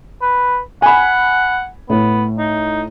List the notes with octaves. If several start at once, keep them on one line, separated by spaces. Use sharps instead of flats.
B4
F#5 G#5 B5
A2 B3
D#4